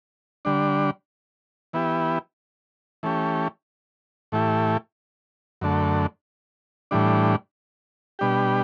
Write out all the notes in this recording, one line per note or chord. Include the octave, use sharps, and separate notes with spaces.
D3 G3 D4
E3 B3 E4 G4
E3 A3 C#4 G4
A2 E3 A3 E4 G4
F#2 D3 A3
A2 E3 G3 D4
B2 G3 D4 G4